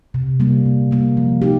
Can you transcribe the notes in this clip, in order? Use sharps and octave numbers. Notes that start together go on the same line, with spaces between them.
C3
G3 A#3
C3
G3 A#3
F3
D#4 G4